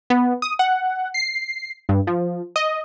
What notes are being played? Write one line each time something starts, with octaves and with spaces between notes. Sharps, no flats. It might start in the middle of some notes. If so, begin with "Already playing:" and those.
B3
D#6
F#5
C7
G2
F3
D#5